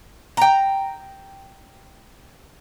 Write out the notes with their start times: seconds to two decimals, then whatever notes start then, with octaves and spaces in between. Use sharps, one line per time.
0.37 G5 A#5